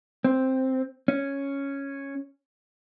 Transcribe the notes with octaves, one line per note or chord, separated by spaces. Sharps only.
C4
C#4